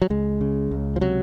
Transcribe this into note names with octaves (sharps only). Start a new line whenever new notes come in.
F#3
C#2 G#3
C#3
C#2
F3
C3 F#3